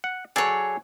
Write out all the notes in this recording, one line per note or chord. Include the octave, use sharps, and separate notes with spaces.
F#5
F#3 G#4 A4 C#5 D5